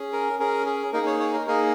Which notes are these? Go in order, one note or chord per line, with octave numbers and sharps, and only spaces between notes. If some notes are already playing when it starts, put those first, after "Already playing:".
Already playing: C#4 G#4
A#4
C#4 G#4 A#4
G#4
A#3 D#4 G#4 A#4
C#5
C#5
A#4
A#3 D#4 G#4 A#4